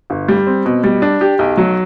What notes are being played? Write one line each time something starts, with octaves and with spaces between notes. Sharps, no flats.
G1
G3
C4
B2
G3
D4
G4
B1
F#3